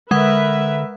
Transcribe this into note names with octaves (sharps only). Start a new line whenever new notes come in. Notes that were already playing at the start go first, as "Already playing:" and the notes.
D3 G#3 A#4 B4 E5 F#5